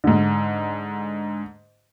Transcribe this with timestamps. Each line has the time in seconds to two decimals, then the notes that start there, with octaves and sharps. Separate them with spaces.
0.04 G#2 D3